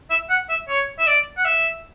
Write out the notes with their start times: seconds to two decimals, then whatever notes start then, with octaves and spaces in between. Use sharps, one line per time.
0.10 E5
0.30 F#5
0.49 E5
0.69 C#5
0.99 E5
1.07 D5
1.37 F#5
1.45 E5